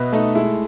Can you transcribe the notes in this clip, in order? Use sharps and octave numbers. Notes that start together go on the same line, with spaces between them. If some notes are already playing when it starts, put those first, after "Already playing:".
Already playing: B2 B4 D#5 E5
A3 D#4
G#3 E4